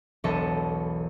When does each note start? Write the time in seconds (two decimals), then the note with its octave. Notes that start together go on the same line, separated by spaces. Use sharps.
0.24 E1 B1 A4 D#5 C#6 D#7